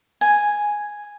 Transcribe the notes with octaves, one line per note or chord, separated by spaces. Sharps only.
G#5